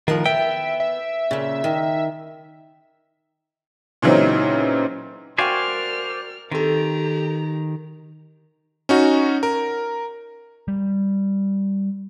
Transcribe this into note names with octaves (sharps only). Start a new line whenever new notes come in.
A2 D#3 F3 A#4 F#5
B3 E5 G5
E5
A#2 C#3
D#3
A#2 C#3 E3 F#3 C4 D#4
F#4 A#4 C5 D5 F5 G5 G#5 F6
D#3 C4 G4 A4 A#5
C#4 D#4 F#4
A#4
G3